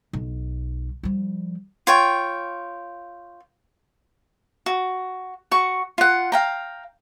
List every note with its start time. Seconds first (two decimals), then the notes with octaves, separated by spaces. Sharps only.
0.13 B1
1.03 F3 G3
1.87 F4 C#5 G5
4.66 F#4
5.51 F#4 C#6
5.98 F4 F#5
6.32 F5 G5 A#5